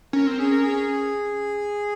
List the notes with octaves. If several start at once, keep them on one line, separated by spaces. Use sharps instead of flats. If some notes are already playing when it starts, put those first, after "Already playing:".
C#4 A#4
C4
C#4 G#4
A#4
G#4